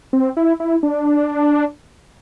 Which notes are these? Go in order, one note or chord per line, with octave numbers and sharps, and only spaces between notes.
C4
E4
E4
D4